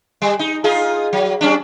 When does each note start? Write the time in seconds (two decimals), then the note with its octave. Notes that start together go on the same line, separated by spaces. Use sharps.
0.22 G3
0.39 D#4
0.64 D#4 F4 G#4
1.13 F#3
1.41 G3 C#4 D4